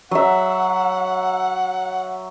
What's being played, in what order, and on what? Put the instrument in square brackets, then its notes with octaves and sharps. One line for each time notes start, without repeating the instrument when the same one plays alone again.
[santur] F#3 E5 [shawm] F#5